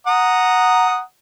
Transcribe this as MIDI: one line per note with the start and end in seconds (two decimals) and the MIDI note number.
0.07 1.00 78
0.07 1.00 82
0.07 1.00 87